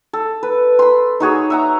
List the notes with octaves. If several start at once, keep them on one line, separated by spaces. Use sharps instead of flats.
A4
B4
B5 C6
D#4 F#4 G#4 C#5
E5 F#5 A#5